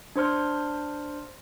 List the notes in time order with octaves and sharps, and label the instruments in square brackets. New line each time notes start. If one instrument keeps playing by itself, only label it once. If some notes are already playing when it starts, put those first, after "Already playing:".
[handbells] D4 C5 C6 F6